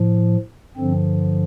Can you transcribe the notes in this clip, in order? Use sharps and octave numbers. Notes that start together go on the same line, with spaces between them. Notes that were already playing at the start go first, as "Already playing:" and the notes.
Already playing: A2 F3
G2 D3 F3 C4